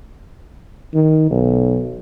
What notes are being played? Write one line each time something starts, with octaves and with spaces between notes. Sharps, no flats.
D#3
B1